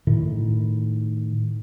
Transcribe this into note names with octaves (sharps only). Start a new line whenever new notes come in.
A2 D#3